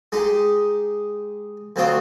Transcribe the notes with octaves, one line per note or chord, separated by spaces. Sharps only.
G#3 D#4 G4
D2 F#3 C4 F4 G5 D#6